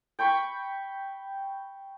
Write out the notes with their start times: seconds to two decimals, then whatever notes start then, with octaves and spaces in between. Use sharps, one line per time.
0.19 G5 B5 C#6